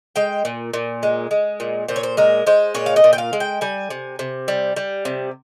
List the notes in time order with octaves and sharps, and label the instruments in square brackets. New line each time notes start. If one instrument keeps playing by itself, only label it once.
[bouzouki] G#3 G5
A#2
A#2
G#3
G#3
A#2
A#2 C5
C#5
C5
G#3 A#4
G#3 C5
A#2 C#5
F5
D#5
A#2
G5
F5
G#3
G5
G3 G#5
C3
C3
G3
G3
C3